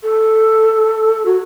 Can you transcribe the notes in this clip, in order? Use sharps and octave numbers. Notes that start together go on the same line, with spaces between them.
A4
F#4